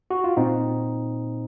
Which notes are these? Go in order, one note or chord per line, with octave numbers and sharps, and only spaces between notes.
F#4
F4
A#2 C4 D#4